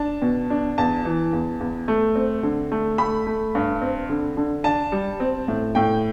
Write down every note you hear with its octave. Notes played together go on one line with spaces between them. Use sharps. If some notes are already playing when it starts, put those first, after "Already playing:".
Already playing: D4 A5
B2
D4
E2 A5
E3
E2
E2
A3
C4
D3
A3
A3 B5
A3
G2
C4
D3
D3
D4 A5
G3
C4
A2
A2 G5